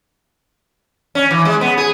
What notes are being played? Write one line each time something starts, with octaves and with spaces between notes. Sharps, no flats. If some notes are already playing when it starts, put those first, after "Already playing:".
C#4
E3
G#3
B3
G#4